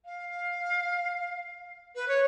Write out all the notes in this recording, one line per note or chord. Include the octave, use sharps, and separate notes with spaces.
F5
B4
C#5